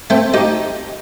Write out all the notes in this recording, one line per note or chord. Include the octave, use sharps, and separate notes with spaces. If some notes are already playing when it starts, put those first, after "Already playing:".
A3 C4
D#4 G4